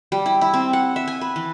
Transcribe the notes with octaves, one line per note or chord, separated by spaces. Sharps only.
G3
E4
E4
C4
F#5
E5
G#5
B4
E3